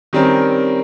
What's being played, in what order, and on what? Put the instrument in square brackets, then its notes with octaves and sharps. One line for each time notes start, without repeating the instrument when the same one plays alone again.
[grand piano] D#3 G3 C4 C#4 A#4